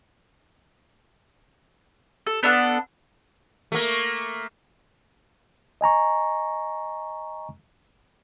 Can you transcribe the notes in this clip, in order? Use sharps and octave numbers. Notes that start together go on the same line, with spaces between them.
A4
B3 D4 A4 F#5
A3 A#3
D#5 G#5 A#5 C#6